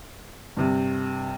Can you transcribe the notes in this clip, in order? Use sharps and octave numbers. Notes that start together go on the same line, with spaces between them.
G2 C3